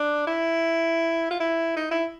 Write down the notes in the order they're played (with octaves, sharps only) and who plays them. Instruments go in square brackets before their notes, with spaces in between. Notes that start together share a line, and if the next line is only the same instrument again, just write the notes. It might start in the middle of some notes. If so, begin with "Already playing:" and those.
Already playing: [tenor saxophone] D4
E4
F4
E4
D#4
E4